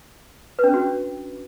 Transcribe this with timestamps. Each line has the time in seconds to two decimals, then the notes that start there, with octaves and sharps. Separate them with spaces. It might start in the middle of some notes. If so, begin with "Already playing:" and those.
0.59 B4
0.64 D4
0.69 C#4
0.74 F#4